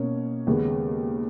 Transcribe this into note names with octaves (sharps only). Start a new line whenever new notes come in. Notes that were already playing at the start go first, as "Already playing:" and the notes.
Already playing: B2 A#3 C#4
D#2 C#3 G#3 B3